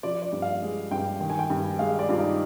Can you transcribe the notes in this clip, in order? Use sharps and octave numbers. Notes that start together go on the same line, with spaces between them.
F3 D5
D5
G2
F5
G#3
G2 G5
D#3 G5
G#5
G5
G2
G#3 F5
D5
G2 F4
D#4